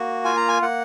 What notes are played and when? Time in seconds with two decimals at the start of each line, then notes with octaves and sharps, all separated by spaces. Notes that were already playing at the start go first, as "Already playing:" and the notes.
Already playing: A#3 F#4
0.25 F4 G#5
0.37 A#5
0.49 G#5
0.62 A#3 F#5